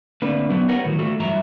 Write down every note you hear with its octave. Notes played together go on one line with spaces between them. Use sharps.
D3 A3 A#3 C4 D4 B4
F#3 B3 D4 D#4
G4 A#4 B4 C#5 F#5
A2 D#3 F#3
A3 F4 F#4 A4
G2 E3 F#3 E5 A#5